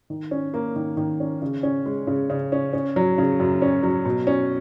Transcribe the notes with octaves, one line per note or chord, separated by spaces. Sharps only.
D#3
C#4
A#3
D#3
D#3
C#4
C#3
C#4
G#3
C#3
C#3
C#4
C#4
F#3
C#3
F#2
C#4
F#3
B2
C#4